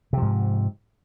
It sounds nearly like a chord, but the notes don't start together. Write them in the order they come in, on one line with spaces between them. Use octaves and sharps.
C3 F3 G#2